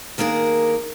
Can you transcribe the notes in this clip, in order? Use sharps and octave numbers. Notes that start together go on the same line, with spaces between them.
D#3 A#3 D4 G#4 A#4